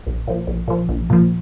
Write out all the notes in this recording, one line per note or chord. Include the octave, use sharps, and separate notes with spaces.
A#1
A#2 F3
A#1
A#2 F3
A#1
A#2 F3